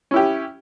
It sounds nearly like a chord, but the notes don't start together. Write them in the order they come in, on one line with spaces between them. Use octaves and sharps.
C#4 E4 G4